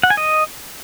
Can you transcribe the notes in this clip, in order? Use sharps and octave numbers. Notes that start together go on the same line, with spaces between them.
F#5
G#5
D#5